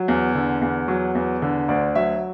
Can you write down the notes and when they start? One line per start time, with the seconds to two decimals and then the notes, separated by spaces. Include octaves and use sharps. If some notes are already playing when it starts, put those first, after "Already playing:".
Already playing: F#3
0.08 E2
0.35 D3
0.62 E2
0.88 F#3
1.15 E2
1.42 D3
1.68 D2 D5
1.95 F#3 E5